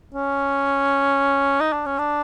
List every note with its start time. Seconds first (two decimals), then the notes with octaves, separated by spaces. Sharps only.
0.14 C#4
1.60 D#4
1.73 D4
1.86 C#4
1.98 D4